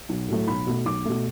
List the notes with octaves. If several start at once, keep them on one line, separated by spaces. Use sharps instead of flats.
B1
A2 F#3 A3
B1 B5
B2 A3
B1 D6
B2 A3